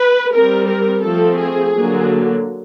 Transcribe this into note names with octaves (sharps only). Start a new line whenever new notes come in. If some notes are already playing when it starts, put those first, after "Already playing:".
Already playing: B4
G3 C4 A#4
A#4
F3 A3 C4 A4
G#4
D3 F#3 A#3